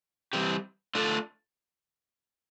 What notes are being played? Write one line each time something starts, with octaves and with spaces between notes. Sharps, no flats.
E3 G3 C4 G4
A3 D4 F4 A4